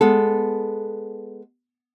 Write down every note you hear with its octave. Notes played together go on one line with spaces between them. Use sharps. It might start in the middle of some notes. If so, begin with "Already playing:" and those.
G#3 B3 A4